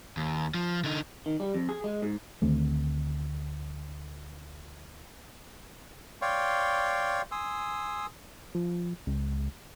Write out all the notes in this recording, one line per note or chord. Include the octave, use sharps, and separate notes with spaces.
D#2
F3
D3 D#4
D#3
G3
F2
G#4
G#3
G#2
D2 D#3 A3 C4
C#5 D5 F5 G5 C6 C#6
G#5 C6 D#6 E6
F3
C#2